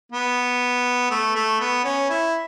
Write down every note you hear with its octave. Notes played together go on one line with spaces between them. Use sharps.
B3
A3
A3
B3
C#4
E4